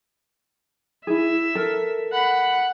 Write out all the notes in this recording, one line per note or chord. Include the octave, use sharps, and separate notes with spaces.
E4 G#4 E5
A4 A#4
F#5 B5